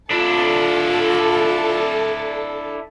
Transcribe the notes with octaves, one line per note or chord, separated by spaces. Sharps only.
D4 E4 F4 A4